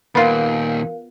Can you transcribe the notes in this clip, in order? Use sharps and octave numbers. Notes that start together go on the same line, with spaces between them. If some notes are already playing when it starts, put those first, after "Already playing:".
D#2 A#2 B3 F4 A#4 F5